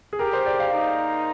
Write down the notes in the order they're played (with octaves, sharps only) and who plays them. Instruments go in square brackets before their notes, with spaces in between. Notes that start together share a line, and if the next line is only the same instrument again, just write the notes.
[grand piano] G#4
[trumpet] G4 [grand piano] A#4
[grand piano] C5
D5
F5
[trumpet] D#4